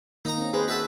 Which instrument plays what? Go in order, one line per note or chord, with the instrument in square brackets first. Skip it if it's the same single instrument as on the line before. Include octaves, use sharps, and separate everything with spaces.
[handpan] D#3 A#3 [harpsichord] D#4 A#5
[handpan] C4 C#4
[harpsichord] G#3 [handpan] G#4 B4 C5
[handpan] F#4 [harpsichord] B4 E5 A5